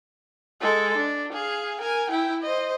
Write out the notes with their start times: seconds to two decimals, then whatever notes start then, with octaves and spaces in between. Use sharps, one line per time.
0.61 G#3 A4
0.97 D4
1.32 G#4 F5
1.81 A#4 G#5
2.10 E4 G5
2.42 C5 D#5